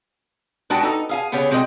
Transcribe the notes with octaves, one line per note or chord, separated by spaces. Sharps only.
G#3 D4 F#4 B4 G5 A5
D#4 A4
G#4 F5 G#5
C#3 B3 G4 G#4 C#5
G#3 C4 F#4 G#4 D#5 G5